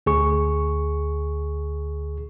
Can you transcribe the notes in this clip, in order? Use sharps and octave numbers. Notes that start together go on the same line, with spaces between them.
D2 G#4 C#6